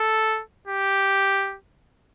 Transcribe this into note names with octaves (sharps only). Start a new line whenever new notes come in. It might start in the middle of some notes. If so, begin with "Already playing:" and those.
Already playing: A4
G4